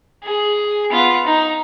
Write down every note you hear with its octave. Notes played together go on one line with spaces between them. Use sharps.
G#4
B3 F4
D#4